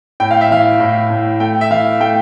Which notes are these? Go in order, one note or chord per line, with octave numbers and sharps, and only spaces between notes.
A2 G5
F5
E5
E3 F5
A2
A2
A3 G5
E5
E3 F5
A3 G5